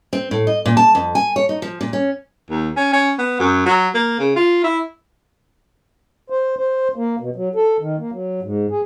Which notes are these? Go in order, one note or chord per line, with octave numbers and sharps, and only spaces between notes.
C4
A2
D#5
A#2
A5
F2
G#5
C#5
D#4
F3
A#2
C#4
D#2
C#4
C#4
B3
F#2
F#3
A#3
C#3
F4
E4
C5
C5
A#3
B2
F#3
A4
D#3
A#3
F#3
G#2
G#4